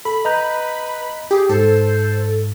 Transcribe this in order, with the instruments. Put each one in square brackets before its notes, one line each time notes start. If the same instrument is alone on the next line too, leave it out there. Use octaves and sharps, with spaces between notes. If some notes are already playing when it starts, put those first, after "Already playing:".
[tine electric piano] A4 [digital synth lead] B5
[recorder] B4 [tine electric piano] D#5 A#5 G6
[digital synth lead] G4 [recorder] G#4
[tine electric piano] G#2 [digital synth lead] A4 [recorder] C5